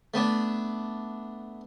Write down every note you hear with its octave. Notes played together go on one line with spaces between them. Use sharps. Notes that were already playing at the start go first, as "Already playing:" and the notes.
A3 B3 D4